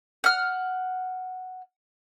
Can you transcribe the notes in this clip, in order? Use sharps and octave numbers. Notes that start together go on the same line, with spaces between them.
F#5 F6